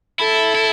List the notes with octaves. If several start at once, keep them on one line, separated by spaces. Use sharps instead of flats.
E4 A4
E4